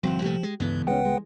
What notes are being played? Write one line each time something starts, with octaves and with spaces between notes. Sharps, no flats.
G1 C2 F3 C4 F#4 F5
C2 A#2 A3 G4
G#3
C#2 G2 D3 E3 B3
G#3 C#4 B4 F#5 G5
G#3